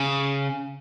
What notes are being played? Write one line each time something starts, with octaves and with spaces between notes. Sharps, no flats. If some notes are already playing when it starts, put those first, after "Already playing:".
Already playing: C#3